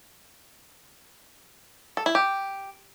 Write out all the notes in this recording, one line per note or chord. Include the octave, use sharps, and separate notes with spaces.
A4
E4
G4